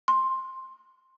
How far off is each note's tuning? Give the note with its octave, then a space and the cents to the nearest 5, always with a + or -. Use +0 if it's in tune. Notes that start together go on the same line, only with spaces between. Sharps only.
C6 +10